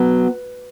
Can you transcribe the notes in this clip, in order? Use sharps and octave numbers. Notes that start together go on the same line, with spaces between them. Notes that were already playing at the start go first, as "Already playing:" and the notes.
Already playing: F#3 B3 B4